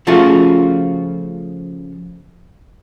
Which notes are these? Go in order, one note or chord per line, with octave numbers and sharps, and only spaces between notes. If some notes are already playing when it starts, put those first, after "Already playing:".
C#3 F3 A3 C#4 F4 F#4